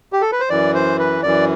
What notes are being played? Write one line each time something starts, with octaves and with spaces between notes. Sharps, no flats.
G4
A4
B4
C5
F#2 E3 D5
C5
B4
F#2 E3 D5